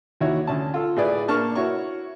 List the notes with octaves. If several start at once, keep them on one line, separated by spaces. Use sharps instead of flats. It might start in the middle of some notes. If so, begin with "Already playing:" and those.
D#2 E4 F#4 C#5
D2 C#4 A5
F4 A4
A2 E4 G#4 B4 D5
A#3 D4 A5 C#6 F6
E4 F#4 C#5 C#6